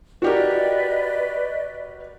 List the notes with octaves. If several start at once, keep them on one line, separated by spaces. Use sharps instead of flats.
F#4 G4 A#4 B4 D5 D#5